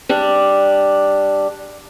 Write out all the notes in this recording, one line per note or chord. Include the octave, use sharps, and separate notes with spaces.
G3 D4